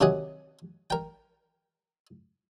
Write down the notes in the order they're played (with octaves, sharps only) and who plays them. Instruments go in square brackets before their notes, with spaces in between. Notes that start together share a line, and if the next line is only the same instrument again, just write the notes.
[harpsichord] C3 D#3 F#3 G#4 F#5
A#4 G5